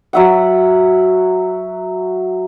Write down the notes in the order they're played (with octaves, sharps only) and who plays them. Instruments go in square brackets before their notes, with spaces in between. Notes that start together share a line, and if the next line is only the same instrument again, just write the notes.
[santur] F#3 E5 F#5